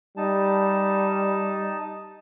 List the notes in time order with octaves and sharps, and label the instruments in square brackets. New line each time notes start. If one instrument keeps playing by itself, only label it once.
[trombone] G3 [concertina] D#4 A5